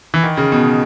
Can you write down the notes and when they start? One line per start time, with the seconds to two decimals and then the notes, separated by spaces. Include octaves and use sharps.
0.14 E3
0.24 D#3
0.37 C#3
0.52 B2